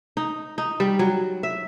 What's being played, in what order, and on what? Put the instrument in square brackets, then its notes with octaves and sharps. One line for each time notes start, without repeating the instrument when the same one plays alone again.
[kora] D#4
D#4
G3
F#3
E5